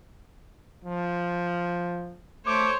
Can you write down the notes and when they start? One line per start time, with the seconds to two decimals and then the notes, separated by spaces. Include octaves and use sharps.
0.84 F3
2.46 A3 C5 C#5 D6